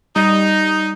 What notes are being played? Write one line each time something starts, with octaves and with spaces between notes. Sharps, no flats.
G3 D#4